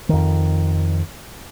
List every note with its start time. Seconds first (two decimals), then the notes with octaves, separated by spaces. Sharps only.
0.09 F2 D#3